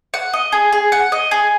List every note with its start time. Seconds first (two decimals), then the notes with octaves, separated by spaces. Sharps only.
0.14 F#5
0.33 D#5
0.52 G#4
0.72 G#4
0.92 F#5
1.12 D#5
1.31 G#4